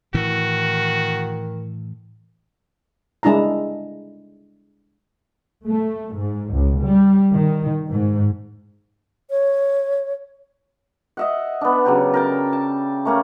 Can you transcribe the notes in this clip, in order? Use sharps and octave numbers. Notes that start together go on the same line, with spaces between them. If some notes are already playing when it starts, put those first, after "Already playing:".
A2 D#3 E3 F#4
G#3 D4 E4 A5 A#5
A3
G#2
C#2
G3
D#3
G#2
C#5
D#5 E5 F#5
B3 D4
C#3 F#3 G4
A#4 G5 A5
A5
A3 A#3 C#4